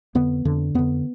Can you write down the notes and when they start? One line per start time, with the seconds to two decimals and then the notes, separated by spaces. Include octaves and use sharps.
0.15 F2 D3 B3
0.45 F2 D3
0.75 F2 D3 B3